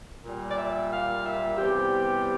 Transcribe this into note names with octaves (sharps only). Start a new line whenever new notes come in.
A#2 G3
D5
E5
F5
E5
E2 C3 G3 G4